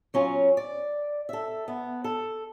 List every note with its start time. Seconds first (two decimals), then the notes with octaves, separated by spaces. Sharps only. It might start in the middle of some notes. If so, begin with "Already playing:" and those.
0.14 F#3 C#4 F4
0.57 D5
1.29 A4 E5
1.68 B3
2.04 A4